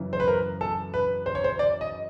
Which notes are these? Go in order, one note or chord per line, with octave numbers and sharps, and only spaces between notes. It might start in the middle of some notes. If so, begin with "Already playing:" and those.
Already playing: F#2 C#3 E3
C5
B4
A#4
A4
B4
C5
C#5
C5
D5
D#5